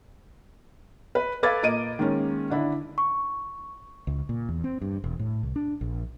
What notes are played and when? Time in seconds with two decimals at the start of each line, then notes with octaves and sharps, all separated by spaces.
1.15 B4
1.43 A4 B4 F5 D6 G#6 A6
1.63 A#2 A#3 D#5 D7 D#7
1.99 D#3 G#3 A#3 C#4
2.50 D3 D4 E4
2.98 C#6
4.07 C#2
4.29 A#2
4.49 E2
4.64 C4
4.81 G2
5.04 E1
5.19 A2
5.43 C2
5.56 D4
5.81 A#1